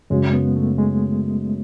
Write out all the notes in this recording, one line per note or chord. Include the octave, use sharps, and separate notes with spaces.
F#2 C#3 F#3 G#3
B3
A3
G#3